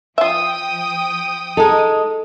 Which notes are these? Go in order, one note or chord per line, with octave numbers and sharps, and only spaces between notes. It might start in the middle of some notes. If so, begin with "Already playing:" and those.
F3 F4 E5 G5 D#6
G#3 D#4 A4